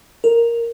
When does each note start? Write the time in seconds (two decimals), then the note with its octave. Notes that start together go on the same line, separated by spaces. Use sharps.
0.24 A#4